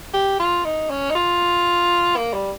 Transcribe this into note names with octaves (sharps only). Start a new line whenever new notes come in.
G4
F4
D#4
C#4
D#4
F4
A#3
G3